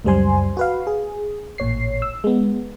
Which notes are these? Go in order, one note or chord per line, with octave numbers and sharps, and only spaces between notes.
C#2 F#2 G3 C5 G#5 C6
F#4 B4 F5
G#4
A1 A#2 C#5 C7
E6
G#3 B3